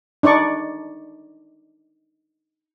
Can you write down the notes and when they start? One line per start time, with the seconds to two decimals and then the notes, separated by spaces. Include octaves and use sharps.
0.23 D4 D#4 D5 C#6